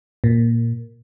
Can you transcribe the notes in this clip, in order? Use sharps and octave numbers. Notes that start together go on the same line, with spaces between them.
A#2